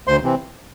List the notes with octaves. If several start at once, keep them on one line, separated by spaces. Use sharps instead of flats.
D2 C5 C6
C3 E3 C4